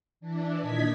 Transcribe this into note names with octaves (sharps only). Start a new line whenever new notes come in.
E3 D4
A#2 D#3 D#5 G#6 B6